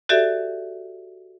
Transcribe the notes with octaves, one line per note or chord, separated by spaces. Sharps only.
F#4 G4 A4 D5 E5